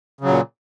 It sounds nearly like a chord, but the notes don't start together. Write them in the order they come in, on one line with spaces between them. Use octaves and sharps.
C#3 F#3 A#2